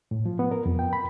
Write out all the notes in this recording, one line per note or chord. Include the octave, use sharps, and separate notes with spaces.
A2
F3
B3
A#4
F2
G5
B5